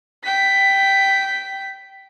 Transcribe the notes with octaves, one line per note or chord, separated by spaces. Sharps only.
G5 B6